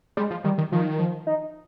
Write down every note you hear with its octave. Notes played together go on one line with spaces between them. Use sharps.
G3 G#3
F3
D#3 G3
D#3
D#3 F3
F3
D#4